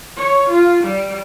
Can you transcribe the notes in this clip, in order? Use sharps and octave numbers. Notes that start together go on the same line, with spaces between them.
C#5
F4
G3